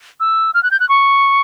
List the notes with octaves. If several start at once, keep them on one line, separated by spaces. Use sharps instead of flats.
E6
F6
F#6
G6
F#6
C#6